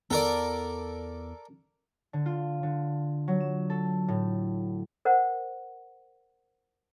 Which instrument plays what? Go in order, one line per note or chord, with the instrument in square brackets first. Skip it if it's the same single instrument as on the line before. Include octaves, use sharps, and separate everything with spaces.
[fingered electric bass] E2 B3 [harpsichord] A4 A#4 D5
[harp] D3
F4
D3
F#3
E7
A4
A2
[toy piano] A#4 C5 F#5